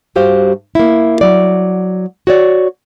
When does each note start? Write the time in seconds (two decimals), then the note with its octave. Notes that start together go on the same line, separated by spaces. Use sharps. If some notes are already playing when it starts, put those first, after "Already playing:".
0.16 G2 F#4 G4 C5 F5
0.75 A#3 E4
1.21 F#3 D5
2.27 F#4 C#5 D5